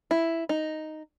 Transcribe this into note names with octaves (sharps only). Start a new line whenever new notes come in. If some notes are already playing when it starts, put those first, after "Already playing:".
E4
D#4